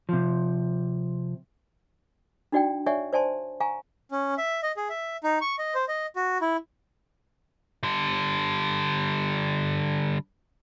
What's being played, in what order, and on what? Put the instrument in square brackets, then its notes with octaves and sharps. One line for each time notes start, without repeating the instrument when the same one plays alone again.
[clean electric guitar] C3 F3
[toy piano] D4 D#4 F#4 D5 F#5 G5
C#5 D5 E5 F#5 G#5 C#6
C5 D5 G#5 A5 C6
F5 G#5 A#5 C#6
[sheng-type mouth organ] C#4
E5
D#5
G#4
E5
D#4
C#6
D#5
C5
D#5
F#4
E4
[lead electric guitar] D3 G3